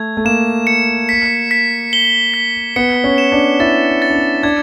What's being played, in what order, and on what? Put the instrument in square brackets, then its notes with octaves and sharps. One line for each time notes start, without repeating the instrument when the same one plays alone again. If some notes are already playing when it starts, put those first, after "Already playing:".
Already playing: [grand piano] A3 [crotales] G#6
[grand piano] A3
[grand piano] A#3 [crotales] E7
[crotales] C#7
B6
B6
G7
B6
[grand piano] B3 [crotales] C#7
[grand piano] C#4
[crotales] E7
[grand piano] D4
[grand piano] E4 [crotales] A6
[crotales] A6
[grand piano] D4
C#4
[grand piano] D4 [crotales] G#6